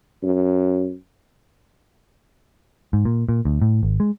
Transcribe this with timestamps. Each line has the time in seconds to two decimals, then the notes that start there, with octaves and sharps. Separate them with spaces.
0.23 F#2
2.93 G#2
3.05 A#2
3.29 A#2
3.45 D2
3.62 A2
3.83 G#1
4.00 G#3